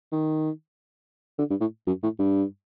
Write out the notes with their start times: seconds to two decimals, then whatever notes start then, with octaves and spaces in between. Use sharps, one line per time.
0.12 D#3
1.39 D3
1.50 G2
1.61 A2
1.87 F#2
2.03 A2
2.19 G2